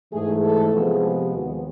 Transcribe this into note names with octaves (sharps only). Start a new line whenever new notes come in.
G#2 E3 A3 G#4
A4
C3 F3 G#3 B3 G#4
G4
D#2 D#3 G#3 B3 F#4